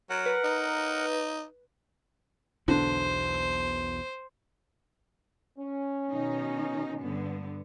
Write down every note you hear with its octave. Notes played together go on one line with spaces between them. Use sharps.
F#3 A#4 F#5
B4
D#4
B1 E2 B2 D3 C5
C#4
B2 D#3 D#4
G2 D3 B3